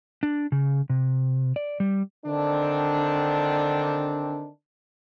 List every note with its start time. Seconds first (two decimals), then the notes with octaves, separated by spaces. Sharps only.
0.23 D4
0.52 C#3
0.90 C3
1.56 D5
1.80 G3
2.26 D3 D#3 C4 D4